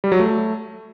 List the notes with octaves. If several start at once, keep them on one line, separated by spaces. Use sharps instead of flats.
G3
F#3
A3